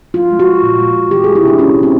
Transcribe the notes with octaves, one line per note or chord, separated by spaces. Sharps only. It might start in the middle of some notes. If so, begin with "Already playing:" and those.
F3 F4
G#3
F#4
F3
A#2
G#3
A#2
E3 G4
G#3 G#4
E4
C3 D4
C3 C#4
C3
C4